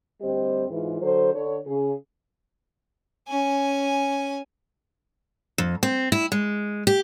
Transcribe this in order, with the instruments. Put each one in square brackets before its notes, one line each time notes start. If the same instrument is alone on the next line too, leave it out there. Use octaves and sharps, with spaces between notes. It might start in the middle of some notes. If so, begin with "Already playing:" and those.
[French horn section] D2 G3 C4 G4 C5 D#5
G#2 E3 F4
D3 F#3 A4 C5
D3 C#5
C#3 G#4
[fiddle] C#4 G#5
[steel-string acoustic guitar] F2
C4
E4
G#3
G4